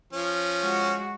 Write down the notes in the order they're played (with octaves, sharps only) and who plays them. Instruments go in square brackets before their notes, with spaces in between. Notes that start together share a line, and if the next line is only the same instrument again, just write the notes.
[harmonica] F3 C#4
[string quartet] G#3 F#4